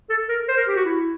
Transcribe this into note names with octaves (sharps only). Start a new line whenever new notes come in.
A4
A#4
C5
A#4
G4
F#4
E4